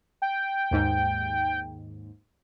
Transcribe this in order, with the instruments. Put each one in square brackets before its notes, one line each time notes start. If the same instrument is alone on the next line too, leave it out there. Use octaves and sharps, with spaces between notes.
[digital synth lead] G5
[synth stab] D#2 G#2